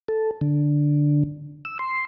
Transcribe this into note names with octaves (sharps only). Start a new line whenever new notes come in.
A4
D3
E6
C6